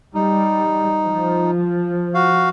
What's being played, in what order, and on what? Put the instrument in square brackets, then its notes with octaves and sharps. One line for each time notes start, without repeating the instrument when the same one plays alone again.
[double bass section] G3 [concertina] D#4
[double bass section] F3
[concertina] F#4 F5